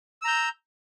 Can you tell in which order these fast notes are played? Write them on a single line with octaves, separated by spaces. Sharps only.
E6 A#5 G6